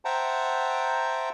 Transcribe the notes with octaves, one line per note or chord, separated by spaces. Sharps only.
C5 E5 F#5 G5 A5 A#5